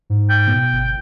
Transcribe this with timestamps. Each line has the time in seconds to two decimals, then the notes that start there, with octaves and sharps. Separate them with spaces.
0.10 G#2
0.29 G5
0.47 B2
0.73 G1